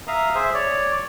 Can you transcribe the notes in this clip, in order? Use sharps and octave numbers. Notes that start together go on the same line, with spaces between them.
E5 F5 A#5 D#6
G#4 C5 E5
C#5 D5